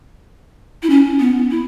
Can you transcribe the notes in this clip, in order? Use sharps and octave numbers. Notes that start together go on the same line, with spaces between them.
E4
C#4
B3
E4